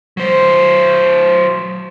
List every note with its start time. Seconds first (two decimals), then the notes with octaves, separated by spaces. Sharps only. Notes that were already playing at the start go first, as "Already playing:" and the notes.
0.17 F#3 C5